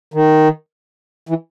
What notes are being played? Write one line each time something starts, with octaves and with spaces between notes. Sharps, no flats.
D#3
E3